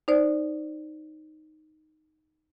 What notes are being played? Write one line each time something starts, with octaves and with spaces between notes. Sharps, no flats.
D#4 C5 D5